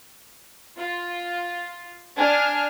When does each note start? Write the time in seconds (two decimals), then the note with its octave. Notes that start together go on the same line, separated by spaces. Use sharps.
0.78 F4
2.16 D4 G#5 F6